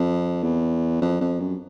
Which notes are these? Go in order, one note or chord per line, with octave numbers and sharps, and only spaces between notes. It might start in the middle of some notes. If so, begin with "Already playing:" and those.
Already playing: F2
E2
F2
F2
F#2